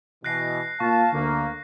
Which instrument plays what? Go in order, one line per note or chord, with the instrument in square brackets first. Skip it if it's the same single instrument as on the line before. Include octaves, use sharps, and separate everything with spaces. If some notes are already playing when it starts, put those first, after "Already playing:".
[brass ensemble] B2 E3 [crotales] F#6 A#6 C7
[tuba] A#2 [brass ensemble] F5 A5 [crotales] C#6
[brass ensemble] D2 A#3 [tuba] D3